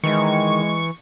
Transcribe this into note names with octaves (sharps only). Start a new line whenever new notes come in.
D#3 E3 G#3 C#6